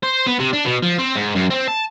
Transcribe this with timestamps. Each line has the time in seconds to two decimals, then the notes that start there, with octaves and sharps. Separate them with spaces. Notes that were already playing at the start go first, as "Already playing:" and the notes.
0.03 C5
0.27 B3
0.39 C3
0.53 D4
0.65 B2
0.83 F3
0.99 C4
1.16 G#2
1.35 F#2
1.50 C4
1.68 A5